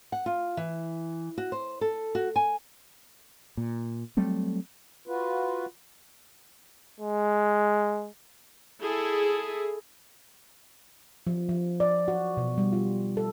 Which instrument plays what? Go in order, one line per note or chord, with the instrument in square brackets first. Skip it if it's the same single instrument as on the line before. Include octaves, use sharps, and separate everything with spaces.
[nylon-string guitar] F#5
F4
E3
F#4
C5
A4
F#4
G#5
[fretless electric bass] A#2
F#3 G3 A3 C4
[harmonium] F4 F#4 B4
[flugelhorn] G#3
[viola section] E4 G#4 A4
[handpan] F3
F3
D5
F#4
B2
G3
F4
A4